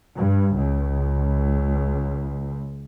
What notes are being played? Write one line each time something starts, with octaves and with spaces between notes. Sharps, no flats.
G2
C#2